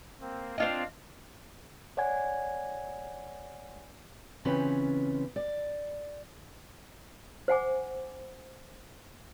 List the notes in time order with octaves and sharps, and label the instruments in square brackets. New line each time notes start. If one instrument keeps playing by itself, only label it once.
[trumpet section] A#3 C4
[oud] C4 F4 D#5 [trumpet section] D4 F5
[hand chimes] C#5 D5 F#5 G#5 G#6
[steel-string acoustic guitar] C#3 E3 C4 C#4 F4 B4
D5
[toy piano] C5 F#5 G#5 D6